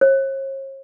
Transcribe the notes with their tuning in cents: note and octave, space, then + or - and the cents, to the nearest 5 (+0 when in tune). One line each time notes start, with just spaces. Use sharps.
C#5 -45